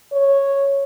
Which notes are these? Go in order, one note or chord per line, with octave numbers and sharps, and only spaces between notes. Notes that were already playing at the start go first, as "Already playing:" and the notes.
C#5